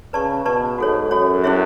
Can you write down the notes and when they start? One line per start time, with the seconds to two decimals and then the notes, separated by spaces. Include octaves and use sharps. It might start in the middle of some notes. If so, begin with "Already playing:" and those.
0.13 C#3 B4 D5 A5 C#6
0.45 B2 B4 D5 A5 C#6
0.78 G#2 F#4 A4 C#5
1.11 F#2 F#4 A4 C#5
1.44 C#4 E4 G#4 C#5 E5